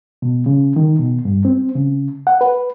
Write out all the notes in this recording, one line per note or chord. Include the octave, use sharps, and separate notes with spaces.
B2
C#3
D#3
B2
G2
C4
C#3
F#5
B4